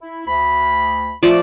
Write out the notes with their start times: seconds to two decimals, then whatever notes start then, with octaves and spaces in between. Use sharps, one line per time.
0.02 E4
0.26 D2 B5
1.23 F3 A3 D5